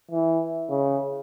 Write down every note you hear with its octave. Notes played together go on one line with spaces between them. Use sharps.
E3
C#3